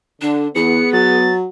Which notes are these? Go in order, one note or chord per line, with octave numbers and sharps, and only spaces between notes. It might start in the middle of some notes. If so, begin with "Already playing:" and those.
D3 D4
E2 B3 G#4 C#7
F#3 A6